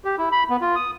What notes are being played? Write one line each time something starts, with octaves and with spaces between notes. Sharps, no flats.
G4
E4
B5
B3
F4
D#6